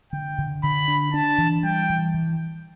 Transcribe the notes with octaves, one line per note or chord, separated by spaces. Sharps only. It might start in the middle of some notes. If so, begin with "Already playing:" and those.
D3 G5
D3
D3 B5
D4
D4 A5
E3
G3 G5
E3
E3